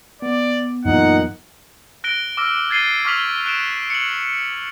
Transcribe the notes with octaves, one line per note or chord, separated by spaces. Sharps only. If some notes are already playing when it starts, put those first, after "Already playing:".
B3 D5
F#2 A#2 E3 F#3 D#4 F#5
F#6 A#6 D7 G7
D6 E6 F6 A#6
G#6 A6 C7 D#7 G7
C#6 D6 F6 B6 F7 F#7
F#6 D7 E7
C#7 F#7